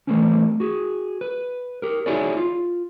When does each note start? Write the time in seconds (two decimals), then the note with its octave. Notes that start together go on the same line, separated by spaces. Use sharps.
0.07 E3 G3 A3 A#3 C4 C#4
0.60 F#4 G#4
1.21 B4
1.82 G4 A#4
2.06 D#4 E4 F#4 G#4 C#5 D5
2.37 F4